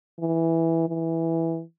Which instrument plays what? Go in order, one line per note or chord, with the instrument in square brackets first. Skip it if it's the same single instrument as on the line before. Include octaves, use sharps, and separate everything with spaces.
[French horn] E3
E3